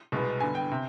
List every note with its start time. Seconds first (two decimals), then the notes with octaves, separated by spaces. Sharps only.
0.12 C2 B2 G#3 B3
0.40 G2 D3 G3 B3 G#5
0.55 G5
0.71 C3